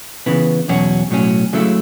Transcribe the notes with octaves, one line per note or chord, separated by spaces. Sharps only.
C#3 E3 B3
E2 B2 F#3 C#4 F#4
B1 A2 F#3 C#4
C#2 C#3 F#3 A3 E4